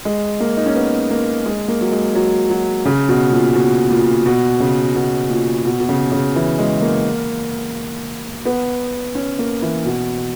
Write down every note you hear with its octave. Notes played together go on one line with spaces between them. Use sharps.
G#3
A#3
D#4
C#4
B3
A#3
G#3
A#3
F#3
G#3
F#3
F#3
C#3
B2
A#2
B2
A#2
B2
C#3
B2
A#2
B2
B2
C#3
C#3
E3
G#3
A#3
B3
C#4
A#3
E3
B2